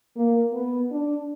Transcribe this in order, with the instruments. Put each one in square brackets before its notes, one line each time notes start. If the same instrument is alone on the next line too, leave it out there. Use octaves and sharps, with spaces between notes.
[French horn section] A#3
B3
D4